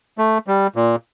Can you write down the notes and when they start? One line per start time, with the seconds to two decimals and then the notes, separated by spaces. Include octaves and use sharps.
0.18 A3
0.47 G3
0.76 A#2